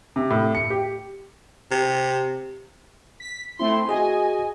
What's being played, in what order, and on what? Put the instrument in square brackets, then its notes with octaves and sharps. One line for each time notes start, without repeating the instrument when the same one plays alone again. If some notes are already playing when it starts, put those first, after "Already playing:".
[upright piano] C3
A2
C#7
G4
[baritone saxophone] C3
[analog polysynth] B6
[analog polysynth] A3 C4 E4 [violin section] C6
[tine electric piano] F#4 G#4 [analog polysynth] D#5 [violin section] G#5